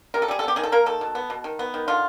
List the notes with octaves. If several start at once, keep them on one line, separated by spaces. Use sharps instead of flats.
C3 A#4
A4
G3 G#4
A4
B3 G4
D#3 G#4
A4
A#3 A#4
D#3 A4
B2
B3
B2
D#3
B3
D#3
D3 F4